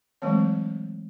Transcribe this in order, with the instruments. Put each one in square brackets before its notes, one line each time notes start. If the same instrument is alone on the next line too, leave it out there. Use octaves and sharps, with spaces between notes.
[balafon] E3 F#3 G#3 A3 C4 C#5